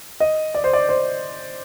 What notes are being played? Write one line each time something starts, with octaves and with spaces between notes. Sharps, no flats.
D#5
D5
C5
D5
C5